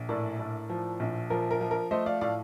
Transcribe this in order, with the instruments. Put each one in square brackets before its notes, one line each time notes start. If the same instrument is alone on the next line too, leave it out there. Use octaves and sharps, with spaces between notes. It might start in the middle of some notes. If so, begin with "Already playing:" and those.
Already playing: [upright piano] A#1
A2 A#4 D5
A2
F3
A#1
F3 A#4
A#4
F3
A#4
A3 C5 D#5
D5 F5
A2 D5 F5